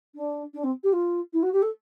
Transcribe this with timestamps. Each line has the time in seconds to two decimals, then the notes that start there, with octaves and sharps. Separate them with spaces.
0.15 D4
0.54 D4
0.64 C4
0.83 G4
0.93 F4
1.33 E4
1.43 F#4
1.53 G4
1.62 A4